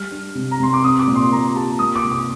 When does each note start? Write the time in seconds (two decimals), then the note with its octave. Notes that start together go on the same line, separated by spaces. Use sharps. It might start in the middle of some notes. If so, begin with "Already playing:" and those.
Already playing: G3 F6
0.11 D4
0.35 C3
0.51 A#5
0.60 C3 C6
0.73 D6
0.84 C4 D#6
0.99 D6
1.07 A#2
1.15 C6
1.32 A#2 A#5
1.56 G4 A5
1.79 A#3 D#6
1.96 D6
2.04 C3
2.12 D6